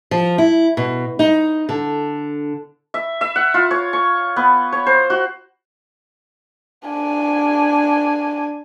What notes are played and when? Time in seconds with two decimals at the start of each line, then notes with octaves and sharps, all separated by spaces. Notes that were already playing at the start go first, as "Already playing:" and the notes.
0.11 F3
0.38 E4
0.77 B2
1.19 D#4
1.69 D3
2.94 E5
3.21 E5
3.36 F#5
3.54 F4
3.71 C#5
3.93 C#6
4.36 B3
4.72 C#5
4.86 C5
5.10 F#4
6.89 D4 G#5